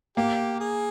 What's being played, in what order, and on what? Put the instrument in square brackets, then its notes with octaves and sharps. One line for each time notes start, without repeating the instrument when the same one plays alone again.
[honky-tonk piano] A#3 [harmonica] G4
[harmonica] G#4